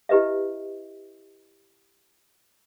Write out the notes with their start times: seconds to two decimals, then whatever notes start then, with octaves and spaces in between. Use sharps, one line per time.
0.09 E4 G4 B4 D#5 E5